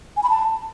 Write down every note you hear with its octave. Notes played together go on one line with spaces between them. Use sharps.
G#5
B5
A5